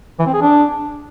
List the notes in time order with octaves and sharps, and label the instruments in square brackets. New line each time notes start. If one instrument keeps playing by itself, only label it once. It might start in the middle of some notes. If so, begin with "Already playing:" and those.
[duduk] E3
C4
G#4
D4